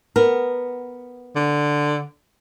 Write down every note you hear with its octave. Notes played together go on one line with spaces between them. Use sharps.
B3 A#4
D3